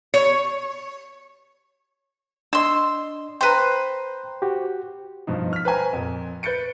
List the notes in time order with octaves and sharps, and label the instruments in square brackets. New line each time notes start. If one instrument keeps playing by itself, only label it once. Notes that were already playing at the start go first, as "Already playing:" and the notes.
[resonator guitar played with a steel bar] C#5
[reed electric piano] D4 D#5 [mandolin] C6 E6
[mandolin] B4 C5 [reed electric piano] G5 A#5
[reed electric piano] F#4 G4
[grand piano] G2 B2 F3 D#4
F6 B6
B4 C5 G5 G#5 A#5
F2 A#2
B4 G6 A6 C#7 D7